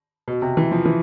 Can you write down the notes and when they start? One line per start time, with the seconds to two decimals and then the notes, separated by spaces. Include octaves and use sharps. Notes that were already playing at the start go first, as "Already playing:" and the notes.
0.28 B2
0.42 C3
0.57 E3
0.72 F3
0.86 E3